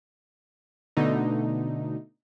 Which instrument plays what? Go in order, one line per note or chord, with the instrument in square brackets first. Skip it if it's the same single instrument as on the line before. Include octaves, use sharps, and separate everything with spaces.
[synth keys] B2 D3 A3 D#4